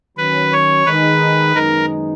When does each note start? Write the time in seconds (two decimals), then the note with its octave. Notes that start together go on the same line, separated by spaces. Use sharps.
0.17 D#3 F#3 C#4 B4
0.53 C#5
0.86 D#3 G#3 D#4 B4
1.55 F#2 D#3 G#3 B3 D#4 A#4